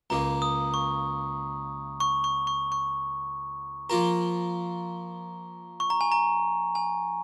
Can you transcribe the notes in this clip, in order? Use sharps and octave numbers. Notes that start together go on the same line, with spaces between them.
C#2 C#3 A#3 A#5
D#6
C#6
C#6
C#6
C#6
C#6
F3 A#3 F4 A#4 A#5
C#6
A#5
G#5
A#5
G#5